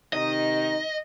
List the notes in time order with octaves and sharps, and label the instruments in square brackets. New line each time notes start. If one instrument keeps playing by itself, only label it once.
[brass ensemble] C3 D#3 D#4 [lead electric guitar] D#5